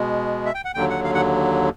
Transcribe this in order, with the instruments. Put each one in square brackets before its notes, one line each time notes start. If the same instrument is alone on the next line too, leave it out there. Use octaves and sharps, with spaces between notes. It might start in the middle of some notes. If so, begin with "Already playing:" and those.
Already playing: [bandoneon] B2 G#3
E5
G5
F#5
D#2 D3 F#3 G5
F#5
F5
F#5